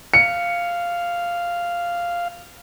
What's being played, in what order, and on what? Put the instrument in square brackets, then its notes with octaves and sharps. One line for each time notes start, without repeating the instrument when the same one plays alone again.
[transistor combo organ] F5 [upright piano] C#7